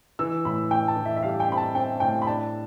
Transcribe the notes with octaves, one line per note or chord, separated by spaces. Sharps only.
E3 E6
A2 B5
A2 G5
A5
E3
E5
E5
G3 F5
G5
C4 B5
A5
C4 G5
A2 G5
B5
D4 A5